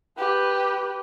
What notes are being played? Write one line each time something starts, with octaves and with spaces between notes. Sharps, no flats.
G4 B4